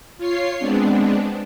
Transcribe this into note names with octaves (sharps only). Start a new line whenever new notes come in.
F4 C#5 C7
G#3 B3 C4 D4